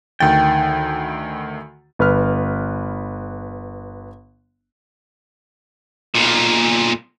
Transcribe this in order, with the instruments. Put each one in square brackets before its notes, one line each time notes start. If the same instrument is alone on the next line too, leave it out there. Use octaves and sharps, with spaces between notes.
[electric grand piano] D2 D#3 A6 [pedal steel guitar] G5
[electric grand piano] G1 B4 F6
[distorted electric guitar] B1 A#2